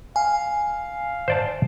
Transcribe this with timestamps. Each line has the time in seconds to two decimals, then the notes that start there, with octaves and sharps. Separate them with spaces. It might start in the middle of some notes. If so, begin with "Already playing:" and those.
0.16 F5 G#5
1.28 C5 D5 A5